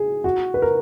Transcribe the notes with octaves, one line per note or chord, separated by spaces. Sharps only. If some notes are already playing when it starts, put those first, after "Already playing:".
Already playing: G#4
F#4
B4
A#4